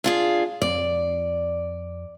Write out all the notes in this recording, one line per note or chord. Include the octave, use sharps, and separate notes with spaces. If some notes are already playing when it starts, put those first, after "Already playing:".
D4 F4 G#4
F2 C4 D5